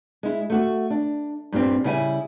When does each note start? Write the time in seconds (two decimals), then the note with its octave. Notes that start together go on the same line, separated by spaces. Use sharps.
0.23 G#3 E4
0.50 A3 F#4
0.90 D4
1.52 G2 A#2 G3 C4
1.84 C#3 G3 E4 G5 G#5